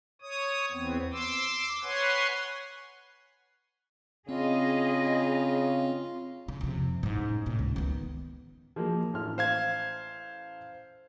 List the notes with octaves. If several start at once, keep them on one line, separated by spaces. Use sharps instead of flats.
C#5 D#6
E2 B3 C4
C6 D6 E6
B4 C#5 F#5 G#5 C6
C#3 C4 F4 G#4 D#5
C#3
F2 C3
A1 G#2
A2 C3
C#2
D#3 B3
F3 G#3 A#3
A1 F6
C5 F5 G#6